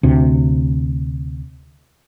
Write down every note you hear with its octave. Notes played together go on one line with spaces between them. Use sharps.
D2 C3